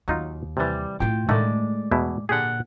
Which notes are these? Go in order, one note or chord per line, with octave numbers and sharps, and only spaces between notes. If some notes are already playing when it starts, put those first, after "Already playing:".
D#2 F#3 D#4 F4
C3 E3 G3 D5
A2 E4 F4 G5
A2 D3 D#3 G#3 A3 D5
E2 B2 E4
A#2 D3 G4 G#4 F#5